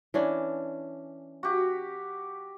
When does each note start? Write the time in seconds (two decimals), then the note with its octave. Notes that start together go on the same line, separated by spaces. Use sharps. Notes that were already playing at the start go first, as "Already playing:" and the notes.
0.14 E3 C#4 D4
1.43 F#4 G4